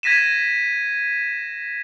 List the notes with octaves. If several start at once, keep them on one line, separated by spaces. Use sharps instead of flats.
G#6 A#6 B6 D#7 E7